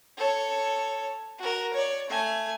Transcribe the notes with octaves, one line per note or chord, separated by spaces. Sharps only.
A4 C#5
F#4 A#4
C#5 D5
A3 G#5